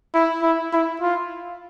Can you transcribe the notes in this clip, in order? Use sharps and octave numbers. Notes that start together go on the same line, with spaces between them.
E4
E4
E4
F4